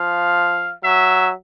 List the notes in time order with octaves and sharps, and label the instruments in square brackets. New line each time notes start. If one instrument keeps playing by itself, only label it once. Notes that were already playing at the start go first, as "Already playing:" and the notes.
Already playing: [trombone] F3 [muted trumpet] F5
[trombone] F#3 [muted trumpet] E5